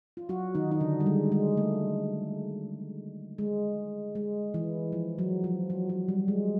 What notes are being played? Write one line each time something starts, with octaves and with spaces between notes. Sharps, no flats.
F4
F#3 F#4
D#3 D#4
D#4
D3 D4
G3
G#3
G#3
A3
G#3
G#3
E3
F3
F#3
F3
F#3
F#3
G3
G#3